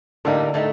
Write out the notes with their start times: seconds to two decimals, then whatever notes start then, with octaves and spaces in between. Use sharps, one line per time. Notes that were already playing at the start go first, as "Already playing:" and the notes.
0.25 A2 D3 G3 A#3 D#4
0.54 A2 A3 D#4